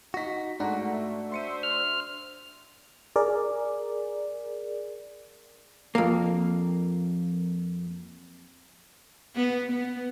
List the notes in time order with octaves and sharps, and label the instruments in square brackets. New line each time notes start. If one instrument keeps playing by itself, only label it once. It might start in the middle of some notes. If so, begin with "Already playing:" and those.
[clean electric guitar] D#4 F#4 [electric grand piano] A#6 B6
[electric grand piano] G#2 F#5 A#5 [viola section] A3 [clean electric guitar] D4 F#4
[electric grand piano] E5
[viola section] C5 E5 [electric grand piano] C6 C#7 D#7
[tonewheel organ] F6
[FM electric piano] G#4 A#4 D5
[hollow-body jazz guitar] F2 A#3
[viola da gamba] B3
B3